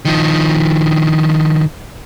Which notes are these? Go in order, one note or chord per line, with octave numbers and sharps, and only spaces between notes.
D#3 F3